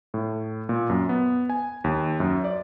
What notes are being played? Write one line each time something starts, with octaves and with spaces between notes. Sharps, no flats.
A2
A#2
F#2
B3
G#5
D#2
F#2
D5